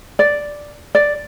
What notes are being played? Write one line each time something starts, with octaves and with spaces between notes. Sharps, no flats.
D5
D5